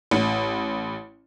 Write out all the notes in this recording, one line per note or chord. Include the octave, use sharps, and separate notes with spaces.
A1